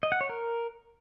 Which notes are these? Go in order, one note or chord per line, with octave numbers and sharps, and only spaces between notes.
D#5
F#5
C#5
A#4